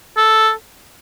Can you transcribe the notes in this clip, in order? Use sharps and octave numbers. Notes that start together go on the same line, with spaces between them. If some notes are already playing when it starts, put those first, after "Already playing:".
A4